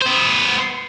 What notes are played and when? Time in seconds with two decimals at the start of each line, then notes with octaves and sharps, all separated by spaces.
0.01 B3 C5